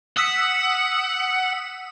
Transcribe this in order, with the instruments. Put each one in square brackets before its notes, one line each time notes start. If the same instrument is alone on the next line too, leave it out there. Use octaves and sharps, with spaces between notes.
[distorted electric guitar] F#5 [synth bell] D#6 E6 B6